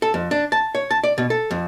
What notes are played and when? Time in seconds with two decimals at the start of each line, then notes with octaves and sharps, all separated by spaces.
0.02 A4
0.14 F2
0.31 D4
0.52 A5
0.75 C#5
0.91 A5
1.03 D5
1.18 B2
1.30 A4
1.51 F2